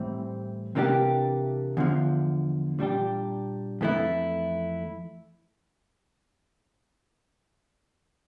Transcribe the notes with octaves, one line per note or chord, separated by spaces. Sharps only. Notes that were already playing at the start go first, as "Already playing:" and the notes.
Already playing: A2 E3 G3 C4
C3 E3 A#3 D4 G4
E2 D3 F3
A#2 G3 D4 G4
F2 E3 A3 E4